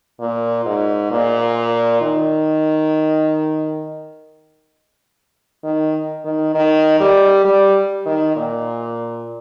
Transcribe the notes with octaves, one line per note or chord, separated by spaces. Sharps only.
A#2
G#2
A#2
D#3
D#3
D#3
D#3
G3
G3
D#3
A#2